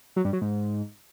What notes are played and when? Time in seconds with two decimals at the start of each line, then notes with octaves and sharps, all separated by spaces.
0.16 F#3
0.25 G2
0.33 F#3
0.42 G#2